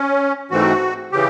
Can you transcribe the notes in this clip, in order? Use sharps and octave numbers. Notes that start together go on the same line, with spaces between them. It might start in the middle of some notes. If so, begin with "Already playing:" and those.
Already playing: C#4
G#2 E3 A3 C4 F#4
C#3 E3 G4